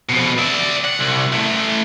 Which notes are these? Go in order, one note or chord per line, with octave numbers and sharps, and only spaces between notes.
F2 B2
D5 E5
F#5
C2
E3 A3